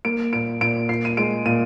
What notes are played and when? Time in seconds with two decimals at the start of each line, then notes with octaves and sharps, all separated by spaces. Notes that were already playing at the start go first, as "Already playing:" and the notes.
0.05 A#3 D7
0.33 A#2 D7
0.61 A#2 D7
0.89 A#2 C7
1.05 D#7
1.17 G#3 D7
1.46 A#2 D#7